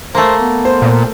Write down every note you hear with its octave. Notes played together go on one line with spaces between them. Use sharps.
A3 A#3 C5
B3
C5
A#2